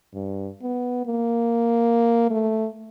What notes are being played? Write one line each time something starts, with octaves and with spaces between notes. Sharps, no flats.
G2
B3
A#3
A3